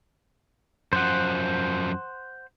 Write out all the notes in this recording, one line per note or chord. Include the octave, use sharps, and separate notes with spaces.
F#2 F3 C5 F#5